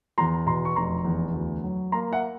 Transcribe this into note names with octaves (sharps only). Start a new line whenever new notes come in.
E2 A#5 C6
B2 A#5 C6
C#6
F1 A#5 C6
E2
D2
F#3
A#3 A#5 C6
E5 F#5